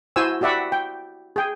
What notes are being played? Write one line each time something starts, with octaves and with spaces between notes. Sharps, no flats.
E4 F#4 C5 G#5 E6
F#4 G4 D5 E5 F#5 B5
G5
G#4 G5